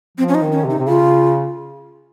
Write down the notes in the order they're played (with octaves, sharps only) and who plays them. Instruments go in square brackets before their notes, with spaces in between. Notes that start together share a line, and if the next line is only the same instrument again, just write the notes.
[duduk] F3 [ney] C4
[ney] C#4
D#4
[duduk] D#3
[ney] C#4
[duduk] C3
[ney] D#4
[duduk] C3
[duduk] C#3 [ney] F4